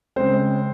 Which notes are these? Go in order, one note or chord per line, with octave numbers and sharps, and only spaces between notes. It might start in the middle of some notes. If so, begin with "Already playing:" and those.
C#3 G#3 C4 C5